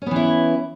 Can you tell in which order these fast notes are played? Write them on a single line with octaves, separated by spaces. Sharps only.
C#4 B3 E3 E4